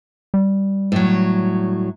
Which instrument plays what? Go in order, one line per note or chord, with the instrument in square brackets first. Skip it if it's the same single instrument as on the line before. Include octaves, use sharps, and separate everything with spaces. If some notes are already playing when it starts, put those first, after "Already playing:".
[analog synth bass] G3
[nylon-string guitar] A2 F#3